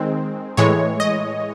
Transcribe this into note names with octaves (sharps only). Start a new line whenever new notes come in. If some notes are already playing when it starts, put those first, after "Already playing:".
Already playing: D#3 G#3 C4
A2 E3 G#3 C#5
D#5